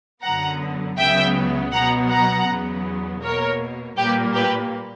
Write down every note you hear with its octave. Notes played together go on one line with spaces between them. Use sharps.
F#2 D3 F#3 B3 F#5 A#5
C#2 C#3 F#3 B3 E5 G5
B2 F#3 B3 F#5 A#5
F#5 A#5
E2 C#3 F#3 B3
B2 A#3 A#4 C#5
A#2 G3 A#3 G4 B4
G4 B4